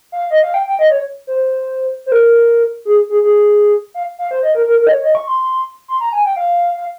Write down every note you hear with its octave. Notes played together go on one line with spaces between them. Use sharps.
F5
D#5
F5
G5
G5
D#5
C#5
C5
C5
A#4
G#4
G#4
G#4
F5
F5
C5
D#5
A#4
A#4
A#4
D#5
C#5
D#5
C#6
C6
C6
A#5
G#5
G5
F5
F5